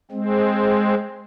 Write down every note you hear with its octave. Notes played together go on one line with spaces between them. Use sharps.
G#3 C4